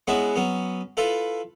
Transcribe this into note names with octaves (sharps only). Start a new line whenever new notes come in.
G#3 B3 C#4 E4 F#4 E5
F#3 B3 C#4
E4 F4 A4 B4